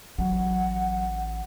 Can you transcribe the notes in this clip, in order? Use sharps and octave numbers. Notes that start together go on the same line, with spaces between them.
A1 F#3 F#5